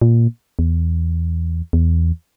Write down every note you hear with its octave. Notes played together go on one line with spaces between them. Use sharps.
A#2
E2
E2